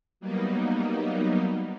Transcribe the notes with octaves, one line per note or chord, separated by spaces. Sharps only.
F#3 G3 A#3 B3 D#4